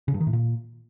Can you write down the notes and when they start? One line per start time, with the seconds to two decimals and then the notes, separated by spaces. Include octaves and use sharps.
0.08 C#3
0.14 G2
0.20 D#3
0.27 A2
0.33 A#2